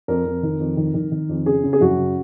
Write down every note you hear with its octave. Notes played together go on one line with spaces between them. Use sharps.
F2 A#4
F2
D#3
F2
D#3
D#3
D#3
F2
C#3 G#4
C#3
G#4
F#2 F#4
C#3